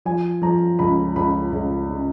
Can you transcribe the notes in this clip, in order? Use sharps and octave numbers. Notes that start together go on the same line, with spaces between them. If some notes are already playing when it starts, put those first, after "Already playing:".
F3 G#5
F3 A#5
C#2 B5
C#2 B5
C#2
C#3